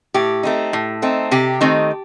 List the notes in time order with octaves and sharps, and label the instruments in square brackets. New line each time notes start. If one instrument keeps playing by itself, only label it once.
[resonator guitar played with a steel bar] A2 G4
A3 C4 D#4
A2
A3 C4 D#4
C3 G4
D#3 A3 C4 D#4